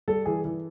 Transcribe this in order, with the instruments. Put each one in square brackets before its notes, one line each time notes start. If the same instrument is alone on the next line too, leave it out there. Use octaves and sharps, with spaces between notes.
[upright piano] G3 [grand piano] A4
[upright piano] E3 [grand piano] G#4
[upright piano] E3